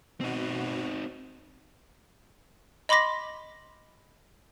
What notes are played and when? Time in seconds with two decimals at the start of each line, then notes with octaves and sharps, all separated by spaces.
0.21 B2 C4 D#4 F#4
2.89 D#5 B5 C6 D6 A#6 B6